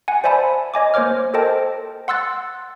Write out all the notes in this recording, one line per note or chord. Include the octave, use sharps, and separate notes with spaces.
F#5 G#5
C5 D5 E5 G#5 A5 B5
C#5 D#5 G#5 D6
A#3 C5 C#5 D6 F6
A4 A#4 C5 D#5 G5 A5
F#5 C6 E6 F#6 A6